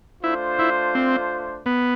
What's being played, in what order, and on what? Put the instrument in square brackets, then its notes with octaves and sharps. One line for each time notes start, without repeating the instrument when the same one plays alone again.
[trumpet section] A3 D4 F4 C5 [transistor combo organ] E4
[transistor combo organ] E4
C4
B3